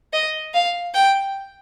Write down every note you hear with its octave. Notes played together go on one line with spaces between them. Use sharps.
D#5
F5
G5